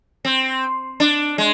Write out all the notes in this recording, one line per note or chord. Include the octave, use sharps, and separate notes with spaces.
C4
D4
G#3